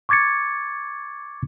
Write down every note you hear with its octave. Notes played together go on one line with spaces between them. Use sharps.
C#6 D6 G#6 A6 C#7